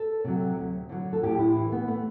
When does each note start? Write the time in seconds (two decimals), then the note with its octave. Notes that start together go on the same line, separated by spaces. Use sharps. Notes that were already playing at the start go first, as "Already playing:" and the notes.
Already playing: A4
0.24 C3 F#3
0.57 D2
0.89 D3 F#3
1.13 A4
1.23 A2 G4
1.38 E4
1.55 E3
1.72 B3
1.88 A3